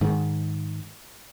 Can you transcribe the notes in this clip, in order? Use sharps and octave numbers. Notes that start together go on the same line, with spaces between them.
G#2 D#3